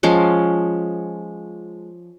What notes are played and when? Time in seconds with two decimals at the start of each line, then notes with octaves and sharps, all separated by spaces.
0.03 F3 G#3 C#4